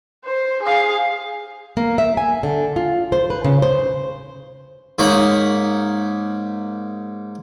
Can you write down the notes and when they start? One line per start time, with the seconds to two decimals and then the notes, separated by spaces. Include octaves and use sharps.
0.25 C5
0.63 G#4 F5
1.77 A#3
1.98 E5
2.17 G#5
2.43 D3
2.76 F4
3.12 C5
3.30 B4
3.44 C#3
3.62 C5
4.99 G#2 A#3 D#4 C#5 B5